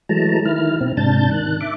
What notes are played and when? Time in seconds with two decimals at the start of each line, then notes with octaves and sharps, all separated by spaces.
0.09 E3 F#3 G#3 A3 A5 A#5
0.45 D#3 E4 F6
0.81 B2 C4
0.97 G#2 C3 D4 A5 G6 A6
1.31 D#3 F#6
1.61 E5 D6